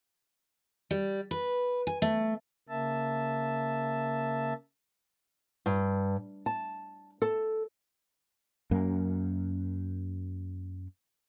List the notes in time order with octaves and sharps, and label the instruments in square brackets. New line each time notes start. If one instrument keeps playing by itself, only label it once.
[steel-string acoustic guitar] G3
B4
G#5
A3
[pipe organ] C#3 A#3 E5 A5
[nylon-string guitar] G2
A5
A4
[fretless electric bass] F#2 A#3